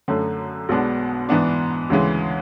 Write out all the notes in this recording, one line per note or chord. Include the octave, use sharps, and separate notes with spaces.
F#2 D3 A3 C#4
B1 B2 G#3 B3 D4
G#2 E3 B3 D4
D2 C#3 E3 G#3